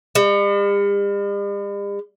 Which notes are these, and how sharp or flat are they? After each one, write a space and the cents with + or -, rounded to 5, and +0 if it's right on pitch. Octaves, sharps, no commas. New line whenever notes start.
G3 +45